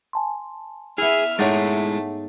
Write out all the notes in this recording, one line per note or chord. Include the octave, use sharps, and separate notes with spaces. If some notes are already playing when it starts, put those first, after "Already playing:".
G#5 A5 C6
B3 E4 G#4 E5 F6
G#2 G#3 A3 D#4 E4 C#5 F#5 A6